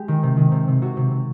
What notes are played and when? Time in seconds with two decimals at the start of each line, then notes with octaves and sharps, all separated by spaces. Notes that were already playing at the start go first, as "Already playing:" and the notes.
Already playing: G#3 G4
0.08 D#3
0.23 C3
0.37 D#3
0.52 C3
0.68 C3
0.82 C3 F#4
0.97 C3
1.11 C3